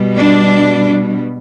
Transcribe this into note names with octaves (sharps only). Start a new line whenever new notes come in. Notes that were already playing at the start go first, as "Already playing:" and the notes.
Already playing: B2 G3
D4